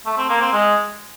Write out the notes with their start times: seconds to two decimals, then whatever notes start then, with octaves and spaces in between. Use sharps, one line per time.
0.06 A3
0.17 C4
0.29 A#3
0.41 C4
0.53 G#3